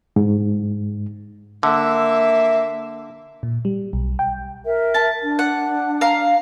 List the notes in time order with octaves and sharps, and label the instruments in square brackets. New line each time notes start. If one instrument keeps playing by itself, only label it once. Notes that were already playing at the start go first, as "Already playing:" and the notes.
[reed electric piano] G#2
[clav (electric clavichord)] D3 [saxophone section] A#3 E5
[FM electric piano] A#2
G3
B1
G5
[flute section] A#4 E5
[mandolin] A5
[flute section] D4
[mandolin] F#5
F5 A#5